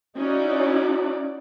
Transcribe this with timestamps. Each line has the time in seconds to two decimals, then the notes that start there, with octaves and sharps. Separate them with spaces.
0.18 C#4 D#4 E4 F#4 D5